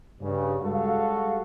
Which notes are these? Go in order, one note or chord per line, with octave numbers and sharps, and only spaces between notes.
G2 C#3
G3 G#3 F#4 A4 F5